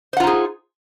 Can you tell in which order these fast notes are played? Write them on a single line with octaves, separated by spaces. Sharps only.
C5 F#5 F4 D#4 G#4